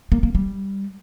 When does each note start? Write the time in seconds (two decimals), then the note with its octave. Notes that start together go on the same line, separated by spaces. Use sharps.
0.12 A#3
0.23 A#3
0.35 G3